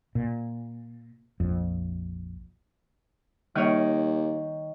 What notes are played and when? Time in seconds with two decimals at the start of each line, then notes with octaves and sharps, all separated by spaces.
0.15 A#2
1.40 A#1 F2
3.56 D#2 D#3 G3 A#3 C#5